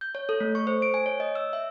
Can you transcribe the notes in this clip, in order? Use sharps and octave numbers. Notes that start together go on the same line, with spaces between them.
G6
C#5
A4
A3
C#6
C5
D7
G#5
C#5
D#5
E6
E5